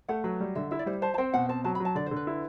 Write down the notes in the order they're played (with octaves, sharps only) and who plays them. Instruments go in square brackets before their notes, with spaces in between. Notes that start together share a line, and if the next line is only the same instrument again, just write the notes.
[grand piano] A3 [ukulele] F#5
[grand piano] F#3 [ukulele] B4
[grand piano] G3
[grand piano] D3 [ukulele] E5
[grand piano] E4 [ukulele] E5
[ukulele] D5
[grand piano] G3 [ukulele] C5
[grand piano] C5 [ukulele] A5
[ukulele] A5
[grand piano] C4 [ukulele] G5
[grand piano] B2 [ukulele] F#5
[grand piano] C4 [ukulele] A5
[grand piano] F#3 [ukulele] A5
[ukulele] B5
[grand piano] F#3
[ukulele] A5
[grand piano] D3 [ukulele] D5
[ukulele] C5
[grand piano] D3
[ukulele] B4
[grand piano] E4